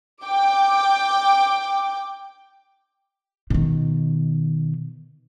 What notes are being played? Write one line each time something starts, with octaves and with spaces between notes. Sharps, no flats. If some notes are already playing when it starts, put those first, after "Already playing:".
G5 D6
B2 D#3